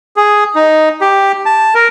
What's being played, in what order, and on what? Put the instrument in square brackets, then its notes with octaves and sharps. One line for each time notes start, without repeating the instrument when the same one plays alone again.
[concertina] G#4
D#4
G4
A5
A#4